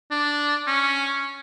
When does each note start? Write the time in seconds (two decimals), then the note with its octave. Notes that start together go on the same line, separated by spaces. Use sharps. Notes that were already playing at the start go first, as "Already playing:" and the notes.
0.11 D4
0.67 C#4